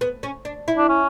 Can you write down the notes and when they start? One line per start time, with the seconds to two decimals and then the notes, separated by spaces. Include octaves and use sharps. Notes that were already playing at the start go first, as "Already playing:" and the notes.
0.01 B3
0.23 C#4
0.45 D4
0.68 E4
0.78 D4
0.89 C#4